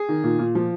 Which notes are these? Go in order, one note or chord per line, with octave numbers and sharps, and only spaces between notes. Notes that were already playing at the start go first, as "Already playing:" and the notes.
Already playing: G#4
D#3
A#2
A#2
F3